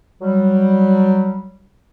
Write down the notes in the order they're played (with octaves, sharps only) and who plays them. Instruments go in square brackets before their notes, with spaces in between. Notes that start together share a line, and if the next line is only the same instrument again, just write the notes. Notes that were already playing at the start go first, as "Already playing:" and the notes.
[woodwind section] F#3 G3